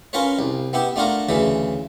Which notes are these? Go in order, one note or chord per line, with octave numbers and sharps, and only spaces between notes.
C#4 F4 A#4 B4 C#5
C2
B3 E4 G4
A3 D4 F4 F#4 A#4
D2 C#3 E3 A3